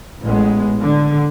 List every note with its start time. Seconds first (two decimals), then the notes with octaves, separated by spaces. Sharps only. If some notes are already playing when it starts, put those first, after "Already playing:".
0.22 A1 G#3 B3
0.82 D3